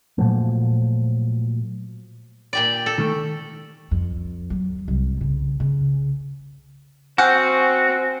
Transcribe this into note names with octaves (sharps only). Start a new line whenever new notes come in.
A#2 F3 F#3 A3
A#2 G4 D5
A4
D#3 A3
F2
F#3
C2
C#3
C#3
C4 F#4 F#5 G#5 F6 G6